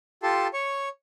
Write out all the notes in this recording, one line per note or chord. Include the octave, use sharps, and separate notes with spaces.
F4 G4 A4 A5 C6
C#5 C#6